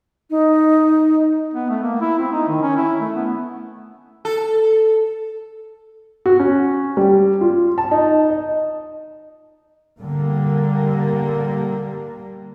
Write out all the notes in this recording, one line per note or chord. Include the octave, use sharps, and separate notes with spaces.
D#4
B3
A3
A#3
E4
C4
D#4
D#3
C#4
E4
A3
B3
A4
F#4
C#4
G3
F4
A5
D#4
D#5
D3 G3 A#3